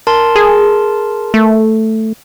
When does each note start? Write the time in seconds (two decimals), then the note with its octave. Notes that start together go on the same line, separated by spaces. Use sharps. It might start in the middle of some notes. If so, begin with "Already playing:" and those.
0.07 A#4 A5 C6
0.36 G#4
1.34 A3